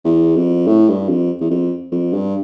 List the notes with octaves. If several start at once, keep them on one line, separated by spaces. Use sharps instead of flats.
E2
F2
A2
G2
F2
E2
F2
F2
G2